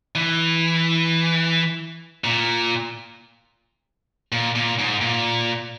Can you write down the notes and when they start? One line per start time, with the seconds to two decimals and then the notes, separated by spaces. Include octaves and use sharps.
0.15 E3
2.24 A#2
4.32 A#2
4.56 A#2
4.79 G#2
5.01 A#2